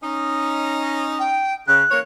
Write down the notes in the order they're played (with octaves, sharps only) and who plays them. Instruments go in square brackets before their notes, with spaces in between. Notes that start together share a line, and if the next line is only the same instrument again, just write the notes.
[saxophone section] C#4 D#4
[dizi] G5
[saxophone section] C#3 [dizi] F#6
[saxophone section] E3 A#3 C#5